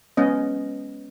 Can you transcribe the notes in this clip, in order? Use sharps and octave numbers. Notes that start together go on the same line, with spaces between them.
G#3 B3 C#4 D#5